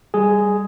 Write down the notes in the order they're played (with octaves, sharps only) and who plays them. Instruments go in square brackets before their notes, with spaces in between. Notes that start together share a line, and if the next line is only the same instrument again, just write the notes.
[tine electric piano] G3 G#4